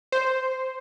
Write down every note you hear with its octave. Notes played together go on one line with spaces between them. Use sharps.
C5